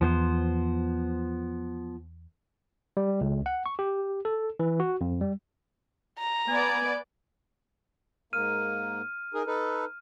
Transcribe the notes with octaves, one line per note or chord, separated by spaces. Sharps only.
E2 F3 B3 C5
G3
C#2
F#5
C#6
G4
A4
E3
F#4
F2
G3
A#5
B3 D5 G#5
G#2 A#3 F6 D#7
D#4 G#4 A#4
D#4 A4 B4